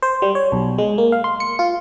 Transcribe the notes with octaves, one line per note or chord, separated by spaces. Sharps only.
C5
G3
C#5
B1
G#3
A#3
F5
C6
C#7
F4